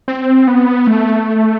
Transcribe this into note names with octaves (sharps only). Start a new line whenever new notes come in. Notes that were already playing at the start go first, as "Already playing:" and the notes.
C4
B3
A3